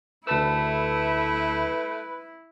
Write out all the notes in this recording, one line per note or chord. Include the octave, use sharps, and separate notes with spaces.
D2 A3 E4 B4 A5 E6